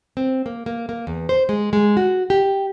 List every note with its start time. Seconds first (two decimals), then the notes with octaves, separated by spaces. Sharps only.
0.17 C4
0.46 A#3
0.66 A#3
0.89 A#3
1.07 E2
1.29 C5
1.49 G#3
1.73 G#3
1.97 F#4
2.30 G4